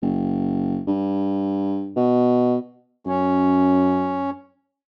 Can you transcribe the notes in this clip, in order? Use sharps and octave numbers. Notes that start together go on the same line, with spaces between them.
F#1
G2
B2
F#2 C#4